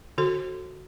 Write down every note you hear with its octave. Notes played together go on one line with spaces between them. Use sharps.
D3 F#4 A4